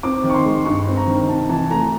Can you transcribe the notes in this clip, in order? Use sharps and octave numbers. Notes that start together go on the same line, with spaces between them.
C4 D6
D#3
C#6
C6
G#3
G2 C#6
C4
A#5
D#3
C3 A5
E3 A5
A3 A#5